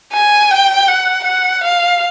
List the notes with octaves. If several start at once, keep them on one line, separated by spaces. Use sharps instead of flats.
G#5
G5
F#5
F#5
F5